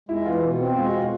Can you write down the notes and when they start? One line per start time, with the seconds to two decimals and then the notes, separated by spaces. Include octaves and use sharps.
0.09 G#3 E4
0.25 E3 F4
0.42 B2
0.60 C4
0.76 G#3 F4
0.87 F#4
0.93 B2 F4